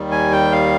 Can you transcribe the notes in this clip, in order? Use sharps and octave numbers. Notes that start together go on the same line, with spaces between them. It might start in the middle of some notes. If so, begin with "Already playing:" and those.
Already playing: D#2 D#3 G3
G#5
G5
F5